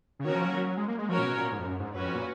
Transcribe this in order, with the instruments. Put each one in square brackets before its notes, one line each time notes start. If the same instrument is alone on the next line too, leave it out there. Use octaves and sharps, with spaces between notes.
[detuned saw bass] C#3
[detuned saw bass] D#3 [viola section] A#3 C#4 F#4 A#4 C#5
[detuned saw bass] F3
F#3
F#3
F#3
G#3
A#3
G#3
[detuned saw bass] F3 [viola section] C#4 F#4 A#4 C#5
[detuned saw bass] A#2
B2
A#2
G#2
F2
F#2
G#2
[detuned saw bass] F#2 [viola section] C#4 F#4 B4
[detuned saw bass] F2
A#2